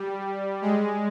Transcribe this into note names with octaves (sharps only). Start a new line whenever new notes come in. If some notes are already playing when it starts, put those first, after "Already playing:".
Already playing: G3
G#3